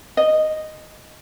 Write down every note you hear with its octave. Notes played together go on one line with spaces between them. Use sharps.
D#5